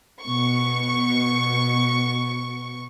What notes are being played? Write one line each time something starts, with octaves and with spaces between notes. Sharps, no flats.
B2 C#6